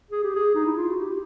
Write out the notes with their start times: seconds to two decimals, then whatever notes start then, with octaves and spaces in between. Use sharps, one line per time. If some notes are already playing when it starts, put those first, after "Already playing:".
0.11 G#4
0.24 G4
0.36 G#4
0.55 D#4
0.66 E4
0.78 F4
0.89 F#4
1.01 G4